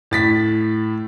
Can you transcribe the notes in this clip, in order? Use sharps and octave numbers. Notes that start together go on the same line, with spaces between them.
A2 A6 B6